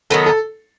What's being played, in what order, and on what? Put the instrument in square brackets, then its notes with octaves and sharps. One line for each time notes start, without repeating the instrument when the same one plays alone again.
[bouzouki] D#3 F#3 B3 [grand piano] A4
[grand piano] A4